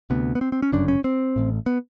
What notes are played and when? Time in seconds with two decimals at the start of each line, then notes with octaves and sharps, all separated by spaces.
0.10 D2 C3 B3
0.35 B3
0.41 C4
0.52 C4
0.62 C#4
0.72 G1 F#2 C#3 D4
0.88 C#4
1.04 C4
1.36 A1 A2
1.66 B3